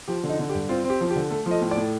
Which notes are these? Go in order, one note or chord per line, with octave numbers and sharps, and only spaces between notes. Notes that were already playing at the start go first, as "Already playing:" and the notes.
F3 G4
D3
D#4
D3
G4
G2
C4 F4
C4
G4
F3
G4
D3
A3 A4
F3
D#5
A2
D5
A2